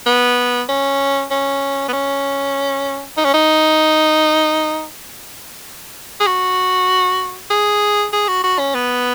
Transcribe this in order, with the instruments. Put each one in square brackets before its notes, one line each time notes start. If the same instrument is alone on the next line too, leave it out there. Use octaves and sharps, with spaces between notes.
[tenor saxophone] B3
C#4
C#4
B3
C#4
D#4
C#4
D#4
G#4
F#4
G#4
G#4
F#4
F#4
C#4
B3